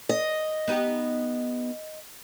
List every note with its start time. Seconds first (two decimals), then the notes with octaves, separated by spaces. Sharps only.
0.09 D#5
0.68 B3 D#4 G4